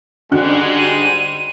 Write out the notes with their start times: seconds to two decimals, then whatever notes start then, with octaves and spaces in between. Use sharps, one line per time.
0.31 G#2 D3 G3 G#3 F#4 F#6
0.78 D#7